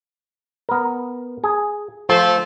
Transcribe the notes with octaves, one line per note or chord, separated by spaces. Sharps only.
B3 A#4
G#4
F3 A3 A4 C5